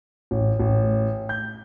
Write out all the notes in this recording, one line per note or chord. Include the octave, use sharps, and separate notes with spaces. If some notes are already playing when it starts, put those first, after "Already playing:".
A1
A1
G6